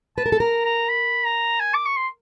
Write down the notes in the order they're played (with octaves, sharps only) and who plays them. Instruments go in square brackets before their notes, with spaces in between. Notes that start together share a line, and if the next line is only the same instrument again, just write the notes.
[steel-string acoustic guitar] B4 [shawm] A5
[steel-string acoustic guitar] A#4
A4
[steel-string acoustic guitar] A#4 [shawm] A#5
[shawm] A#5
B5
A#5
G#5
D6
C#6
C6